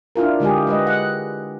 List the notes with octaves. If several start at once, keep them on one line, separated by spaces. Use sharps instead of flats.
D4 E4 F4 A#4
D3 G#3 G4 G#4
G#3 B4 D#5
F#5